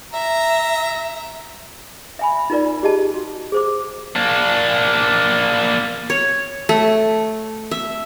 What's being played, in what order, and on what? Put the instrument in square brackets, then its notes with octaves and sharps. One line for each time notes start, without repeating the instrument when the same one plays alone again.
[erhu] E5 [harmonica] A#5
[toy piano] E5 G#5 B5
D#4 F4 A#4 D5
G4 G#4 D#5 A5
F#4
G#4 C5 D6
[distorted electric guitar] A#3 D4
[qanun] C#5
A3
E5